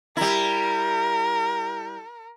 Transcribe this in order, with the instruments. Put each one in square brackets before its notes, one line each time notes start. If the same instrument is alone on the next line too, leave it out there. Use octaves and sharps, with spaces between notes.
[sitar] G3 E4 [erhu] A#4